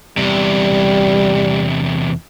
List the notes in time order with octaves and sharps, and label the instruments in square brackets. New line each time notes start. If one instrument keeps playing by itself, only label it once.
[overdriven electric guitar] E2 C3 [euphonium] G3